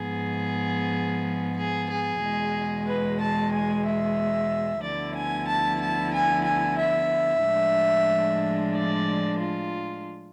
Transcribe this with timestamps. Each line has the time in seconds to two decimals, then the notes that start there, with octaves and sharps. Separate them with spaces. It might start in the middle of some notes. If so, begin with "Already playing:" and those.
Already playing: G#2 F3 B3 G#4
1.56 G#4
1.90 G#4
2.22 E2 B2 G#3
2.87 B4
3.20 A5
3.52 G#5
3.84 E5
4.82 D2 D3 F3 B3 E4 D5
5.15 G#5
5.47 A5
5.81 A5
6.13 G#5
6.46 G#5
6.78 E5
7.43 A2 F3 G#3 D4
8.74 D5
9.39 F4